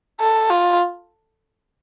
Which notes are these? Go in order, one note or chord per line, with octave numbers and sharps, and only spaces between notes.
A4
F4